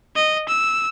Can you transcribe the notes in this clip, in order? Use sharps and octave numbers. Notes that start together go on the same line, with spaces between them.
D#5
E6